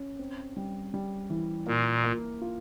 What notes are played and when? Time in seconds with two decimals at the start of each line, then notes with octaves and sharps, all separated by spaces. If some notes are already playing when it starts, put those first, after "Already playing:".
Already playing: C#4
0.19 C4
0.57 G3
0.94 G3
1.30 E3
1.67 A#2 A#3
2.04 A#3
2.42 F4